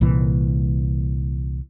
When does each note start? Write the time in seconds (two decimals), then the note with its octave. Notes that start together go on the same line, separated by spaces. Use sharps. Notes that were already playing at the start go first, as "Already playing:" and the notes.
0.01 C2 A#2 E3